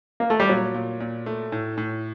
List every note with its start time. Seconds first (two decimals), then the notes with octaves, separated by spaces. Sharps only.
0.20 A#3
0.30 A3
0.40 G3
0.49 A#2 F#3
0.74 A#2
1.00 A#2
1.26 A3
1.52 A2
1.78 A2